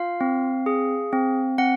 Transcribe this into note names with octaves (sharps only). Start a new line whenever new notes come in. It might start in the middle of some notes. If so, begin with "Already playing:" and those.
Already playing: F4 F5
C4
G#4
C4
C4 F#5